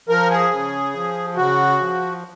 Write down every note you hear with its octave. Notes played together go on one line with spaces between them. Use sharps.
F3 A#4
G#4
C#3
F3
C#3 F#4
F3